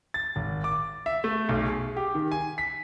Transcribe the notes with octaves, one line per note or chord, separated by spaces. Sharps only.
A6
G#1
D6
E5
A3
B1
G#4
G4
D#3
G#5
B6